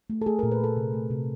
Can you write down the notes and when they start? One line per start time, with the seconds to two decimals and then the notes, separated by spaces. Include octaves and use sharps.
0.10 A3
0.22 A4
0.26 A3 G#4
0.39 A#4
0.43 A#2
0.51 B4
0.60 A3 A4
0.77 C3
0.93 A3
1.10 C3